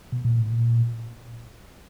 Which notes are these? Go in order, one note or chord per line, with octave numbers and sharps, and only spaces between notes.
B2
A#2
A2
A#2